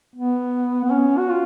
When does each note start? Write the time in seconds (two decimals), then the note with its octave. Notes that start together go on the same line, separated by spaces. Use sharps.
0.16 B3
0.85 B3
0.91 C#4
1.18 F#4
1.30 F4